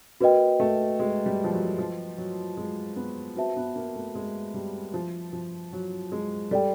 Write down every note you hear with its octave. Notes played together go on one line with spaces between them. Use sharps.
A#3 F#4 B4 D#5 G5
A3
G#3
G3
F3
F#3
F3
F#3
G#3
B3
C4 F#4 B4 E5 A5
B3
A#3
A3
G#3
G3
F3
F3
F#3
G#3
G3 A4 D5 G5